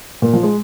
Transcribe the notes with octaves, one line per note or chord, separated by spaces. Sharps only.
A#2
F3
G#3